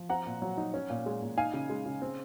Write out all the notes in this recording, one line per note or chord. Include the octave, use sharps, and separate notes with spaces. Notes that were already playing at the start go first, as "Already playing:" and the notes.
Already playing: F3
C4 F#5 A#5
A#2
F#3
D#4
C#4
A#2
G#3
A#2
D#4 F5 G#5
C#3
G#3
C#3
C4